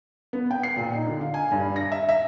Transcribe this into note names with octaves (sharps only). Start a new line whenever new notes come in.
B3
G5
C7
A#2
D#4
D3
F5
G#5
G2
A#6
E5
E5